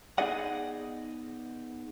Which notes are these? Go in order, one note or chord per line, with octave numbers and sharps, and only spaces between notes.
B3 D#4 G#4 D5 D#5 F#5